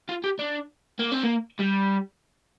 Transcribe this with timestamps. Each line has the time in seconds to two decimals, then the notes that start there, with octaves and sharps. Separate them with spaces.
0.09 F4
0.24 G4
0.39 D4
0.99 A#3
1.12 C4
1.24 A#3
1.60 G3